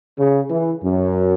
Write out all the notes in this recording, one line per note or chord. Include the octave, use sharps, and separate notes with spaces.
C#3
E3
F#2